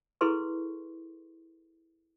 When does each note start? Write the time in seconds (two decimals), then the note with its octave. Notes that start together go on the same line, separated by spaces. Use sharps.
0.21 E4 G#4 A4 B4 C6 C#6